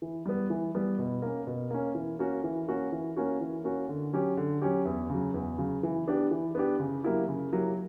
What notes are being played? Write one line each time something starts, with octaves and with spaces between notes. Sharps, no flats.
E3
G3 B3
E3
G3 B3
B2
A#3 C#4
B2
A#3 C#4
E3
A#3 C#4 F#4
E3
A#3 C#4 F#4
E3
A#3 C#4 F#4
E3
A#3 C#4 F#4
D3
F#3 C#4 G4
D3
F#3 C#4 G4
E2
C#3 F#3
E2
C#3 F#3
E3
B3 D4 G4
E3
B3 D4 G4
C#3
F#3 A#3 E4 G4
C#3
F#3 A#3 E4 G4